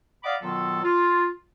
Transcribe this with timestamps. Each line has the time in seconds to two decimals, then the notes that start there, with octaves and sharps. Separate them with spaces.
0.24 D5 D#5 F5 F#5 B5 D6
0.42 B2 D#3 F#3 B3 F4 A4
0.83 F4